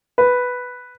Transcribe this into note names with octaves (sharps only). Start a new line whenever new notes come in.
B4